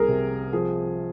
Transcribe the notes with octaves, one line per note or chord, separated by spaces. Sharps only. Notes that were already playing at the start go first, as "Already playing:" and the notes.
Already playing: C2 G#4 A#4
C3
F3 G#4